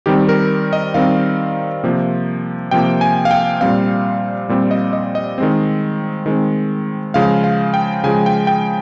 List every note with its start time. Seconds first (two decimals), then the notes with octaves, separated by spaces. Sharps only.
0.06 D#3 G3 C4 G4
0.29 A#4
0.73 D#5
0.94 D#3 G3 C4 F5
1.84 C3 F3 A#3
2.71 C3 F3 A#3 G5
3.01 G#5
3.25 F5
3.31 G5
3.61 A#2 G3 C4 F5
4.49 A#2 G3 C4
4.71 D#5
4.93 D#5
5.15 D#5
5.38 D#3 G#3 C4
6.26 D#3 G#3 C4
7.14 C#3 F3 G#3 F5
7.44 F5
7.74 G5
8.04 C#3 F3 G#3 G#5
8.26 G5
8.47 G5